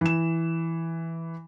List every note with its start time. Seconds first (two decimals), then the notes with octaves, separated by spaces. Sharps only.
0.01 E3 E7